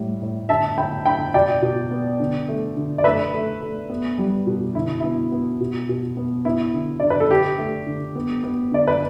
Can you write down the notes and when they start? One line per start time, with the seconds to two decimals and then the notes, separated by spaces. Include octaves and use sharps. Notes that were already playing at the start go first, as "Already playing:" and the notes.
Already playing: A2 G3
0.21 A2
0.49 D3 E5 A5
0.78 D3 G5 B5
1.06 D3 G5 B5
1.34 B2 D5 G5
1.62 B2
1.91 B3
2.20 D3
2.49 A3
2.77 D3
2.98 D5
3.04 A3 B4 E5
3.33 A3
3.61 A3
3.90 B3
4.18 G3
4.47 B2
4.75 D3 E4
5.00 B3 E4
5.32 B3
5.61 B2
5.89 B2
6.17 B3
6.45 B3 E4
6.74 D3
7.00 D3 D5
7.10 B4
7.20 A4
7.30 D3 G4
7.58 A3
7.86 D3
8.15 B3
8.44 B3
8.72 D3 D5
8.88 B4